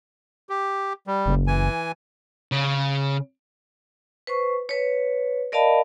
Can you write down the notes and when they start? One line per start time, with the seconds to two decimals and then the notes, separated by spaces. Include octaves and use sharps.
0.49 G4
1.07 G3
1.26 F#1
1.47 E3 G#5
2.52 C#3
4.27 B4 C5 C#6
4.69 B4 C#5
5.52 A#4 D5 D#5 F5 A5 B5